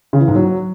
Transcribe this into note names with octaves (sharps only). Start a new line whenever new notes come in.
C#3
E3
G#2
F#3